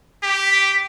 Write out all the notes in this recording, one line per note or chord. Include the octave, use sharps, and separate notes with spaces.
G4 B6